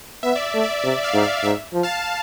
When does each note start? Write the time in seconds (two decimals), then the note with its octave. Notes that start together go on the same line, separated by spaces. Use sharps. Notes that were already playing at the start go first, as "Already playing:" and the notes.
0.23 B3 E5
0.36 D5
0.54 A3
0.62 D5
0.84 C3 D5
1.03 D5 F5
1.14 G#2
1.23 D5 F5
1.44 G#2 E5
1.73 F3
1.83 F5 A5